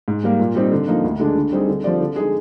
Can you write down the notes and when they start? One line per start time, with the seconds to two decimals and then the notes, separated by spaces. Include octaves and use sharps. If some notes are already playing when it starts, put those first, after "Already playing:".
0.08 G#2
0.24 G3 A#3
0.39 A#2
0.55 G3 C4 D#4
0.71 D3
0.88 F3 A#3 D#4
1.04 D2
1.20 D3 G#3 D4
1.36 D3
1.52 G3 C4 D#4 G#4
1.68 D3
1.84 F3 C4 G4 D5
2.00 D3
2.16 G#3 D#4 G#4